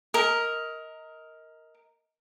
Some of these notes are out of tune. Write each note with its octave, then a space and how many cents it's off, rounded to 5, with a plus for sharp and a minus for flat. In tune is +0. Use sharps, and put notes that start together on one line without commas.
A#4 +0 D#5 +25